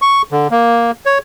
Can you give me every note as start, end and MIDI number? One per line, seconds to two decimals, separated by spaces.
0.02 0.22 85
0.32 0.47 50
0.51 0.91 58
1.06 1.18 73